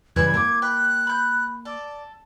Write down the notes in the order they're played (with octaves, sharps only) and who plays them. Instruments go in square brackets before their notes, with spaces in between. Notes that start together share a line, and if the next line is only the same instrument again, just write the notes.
[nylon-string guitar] G2 C#3 E3 [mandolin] E5 B5 F#6 [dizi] G#6
[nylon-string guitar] A#3 [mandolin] C4 B5 D6
[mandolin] G5 B5 [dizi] F#6
[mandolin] B5 G6
[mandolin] A4 [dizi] D5